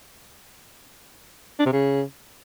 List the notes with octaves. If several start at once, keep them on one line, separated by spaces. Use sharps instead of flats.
D4
C3
C#3